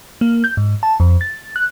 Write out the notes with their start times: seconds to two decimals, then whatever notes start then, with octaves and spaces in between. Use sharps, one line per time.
0.21 A#3
0.44 G6
0.57 G#2
0.83 A5
1.00 F2
1.21 A6
1.56 F#6